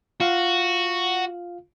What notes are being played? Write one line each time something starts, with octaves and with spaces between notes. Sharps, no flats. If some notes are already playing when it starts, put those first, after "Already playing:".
F4 F#4 F5